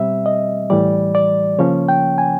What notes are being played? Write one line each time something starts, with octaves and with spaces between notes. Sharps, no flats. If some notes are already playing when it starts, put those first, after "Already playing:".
Already playing: B2 G3 C4 E5
D#5
A2 E3 G3 D5
D5
C#3 F3 A#3 C#4 C#5
G5
G#5